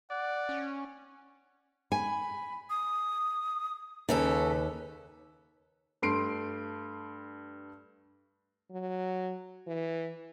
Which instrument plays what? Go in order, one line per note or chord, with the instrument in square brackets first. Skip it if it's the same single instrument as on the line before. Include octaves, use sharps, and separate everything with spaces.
[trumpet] D5 [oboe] F#5
[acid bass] C#4
[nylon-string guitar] G#5 [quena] B5
[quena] D#6
[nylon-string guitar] D#2 [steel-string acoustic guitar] C#3 C#4 A4 [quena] B4
[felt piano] G2 A3 C6 C7 D7
[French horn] F#3
E3